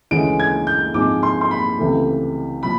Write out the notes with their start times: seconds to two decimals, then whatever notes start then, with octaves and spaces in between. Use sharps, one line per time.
0.11 D2 C#3 E3 G#3 C#4 D7
0.40 G#6
0.67 G6
0.94 G#2 F3 G#3 C4 D6
1.23 C6
1.41 C6
1.51 B5
1.79 C#2 C3 E3 A3
2.63 A#2 F3 B5